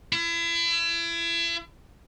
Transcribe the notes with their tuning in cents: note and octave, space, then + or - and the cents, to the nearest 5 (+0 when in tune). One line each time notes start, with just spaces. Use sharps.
E4 +35